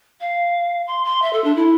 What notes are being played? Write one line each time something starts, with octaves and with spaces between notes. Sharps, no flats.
F5
C6
C6
E5
A4
D4
E4